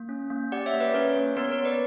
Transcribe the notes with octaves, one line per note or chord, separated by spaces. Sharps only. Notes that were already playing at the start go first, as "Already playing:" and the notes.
Already playing: A#3
C#4
A#3
G4 D5 F#5
C#5 E5
A#3
B4 D5
C#4 A#4 C#5
A#3
B3 A#4 C#5
A#4 C#5
B3
B4 D5